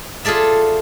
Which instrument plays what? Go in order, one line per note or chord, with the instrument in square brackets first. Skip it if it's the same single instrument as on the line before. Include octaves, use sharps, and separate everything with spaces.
[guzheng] F4 G#4 A4 D5 E5